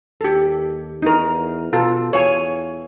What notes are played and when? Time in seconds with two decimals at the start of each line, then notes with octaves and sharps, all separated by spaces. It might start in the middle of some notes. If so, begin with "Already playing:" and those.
0.21 D#2 G4 A4
1.02 E2 D#4 A#4
1.73 B2 F4 A4
2.13 E2 C#5 F5 G#5